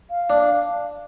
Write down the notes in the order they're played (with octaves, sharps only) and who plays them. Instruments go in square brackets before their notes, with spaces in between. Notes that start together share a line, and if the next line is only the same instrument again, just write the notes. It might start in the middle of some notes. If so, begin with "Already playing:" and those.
[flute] F5
[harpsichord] D4